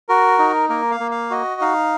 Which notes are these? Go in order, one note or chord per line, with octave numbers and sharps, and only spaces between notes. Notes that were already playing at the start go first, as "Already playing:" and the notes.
F#4 A#4
D#4
A#3 A#4
F5
A#3
F5
F#4 D#5
D#4 F5